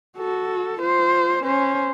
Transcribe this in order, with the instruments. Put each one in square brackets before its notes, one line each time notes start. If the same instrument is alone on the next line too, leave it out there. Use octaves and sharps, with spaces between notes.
[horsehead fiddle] F#4 A4
F4 C5
C#4 C5